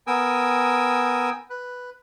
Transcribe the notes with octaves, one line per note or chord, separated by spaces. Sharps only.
B3 A#4 G5 G#5 D#6 E6
B4